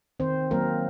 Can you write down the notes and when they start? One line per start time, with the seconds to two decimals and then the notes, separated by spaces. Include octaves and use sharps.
0.20 D#3 C4 C5
0.51 F#3 A#3 C4 A#4